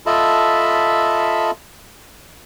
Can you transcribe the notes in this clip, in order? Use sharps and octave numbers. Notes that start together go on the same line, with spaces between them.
F4 A4 D#5 E5 A5 B5